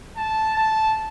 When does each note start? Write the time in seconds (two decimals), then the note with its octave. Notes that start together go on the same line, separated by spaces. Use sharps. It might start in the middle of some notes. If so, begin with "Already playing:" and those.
0.17 A5
0.57 A5